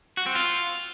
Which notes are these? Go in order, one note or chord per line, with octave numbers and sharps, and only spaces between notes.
F#4
C4
F4